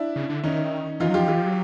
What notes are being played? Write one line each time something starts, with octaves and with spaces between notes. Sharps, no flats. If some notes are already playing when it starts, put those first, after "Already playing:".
Already playing: D4 E4
C#3
D3
D#3 C#4 D#4
E3 D#4 F4
F#3
F4 G4
F3
E3 F4 G4
F3
F#3